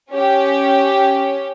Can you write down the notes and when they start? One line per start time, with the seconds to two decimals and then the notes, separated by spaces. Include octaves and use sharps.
0.11 C#4 G4